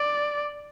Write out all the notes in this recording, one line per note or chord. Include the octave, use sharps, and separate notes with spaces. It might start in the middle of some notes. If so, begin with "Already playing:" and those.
Already playing: D5